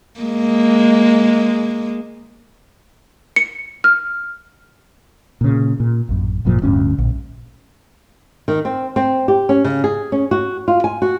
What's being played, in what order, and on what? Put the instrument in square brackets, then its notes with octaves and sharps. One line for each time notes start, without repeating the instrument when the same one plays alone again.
[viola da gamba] G#3 A#3
[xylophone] C#7
F6
[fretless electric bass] A#2 C#3
A#2
A1 F#2
G#1 F#2 A#2 F3
D1 D2 G2 C#4
A#1
[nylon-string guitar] D#3
C4
C4
G4
C#4
C#3
G#4
C#4
F#4
F4
G#5
F#4